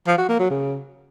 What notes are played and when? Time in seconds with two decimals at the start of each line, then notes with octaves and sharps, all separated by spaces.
0.07 F3
0.18 F#4
0.29 A#3
0.40 F#3
0.50 C#3